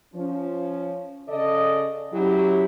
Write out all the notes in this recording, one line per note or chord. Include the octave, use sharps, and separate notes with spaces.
F3 C#4
C#3 A4 D5 D#5
F#3 C#4 E4 G4